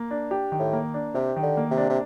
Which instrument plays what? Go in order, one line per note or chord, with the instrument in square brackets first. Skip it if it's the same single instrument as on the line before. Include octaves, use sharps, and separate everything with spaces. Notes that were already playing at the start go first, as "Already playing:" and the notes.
Already playing: [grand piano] A#3
D4
G4
D#3
[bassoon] A2
[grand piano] A#3
D4
[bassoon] C3 [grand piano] G4
[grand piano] D#3
[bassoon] D3
[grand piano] A#3
[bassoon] C3
[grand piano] D4
[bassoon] C3